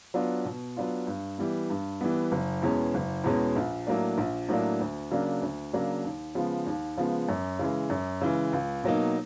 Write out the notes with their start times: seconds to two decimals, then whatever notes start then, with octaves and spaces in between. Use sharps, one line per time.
0.14 F#3 B3 D4 F4
0.45 B2
0.77 F#3 B3 D4 F4
1.07 G2
1.38 E3 G3 B3
1.70 G2
2.01 E3 G3 B3
2.32 F#1
2.62 E2 B2 G#3 C#4
2.94 F#1
3.24 E2 B2 G#3 C#4
3.56 A#1
3.87 A2 F#3 A#3 D4
4.18 A#1
4.49 A2 F#3 A#3 D4
4.80 D2
5.11 C#3 F#3 A#3 D4
5.42 D2
5.73 C#3 F#3 A#3 D4
6.04 D#2
6.35 C#3 F3 G#3 B3
6.66 D#2
6.97 C#3 F3 G#3 B3
7.29 F#2
7.59 C#3 E3 G#3
7.90 F#2
8.21 C#3 E3 G#3
8.53 C#2
8.84 B2 F#3 A#3 D#4